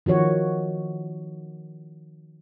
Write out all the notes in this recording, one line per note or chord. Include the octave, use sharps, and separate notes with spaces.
D#3 F3 F#4 C#5